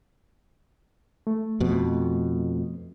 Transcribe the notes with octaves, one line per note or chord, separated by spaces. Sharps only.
A3
F2 B2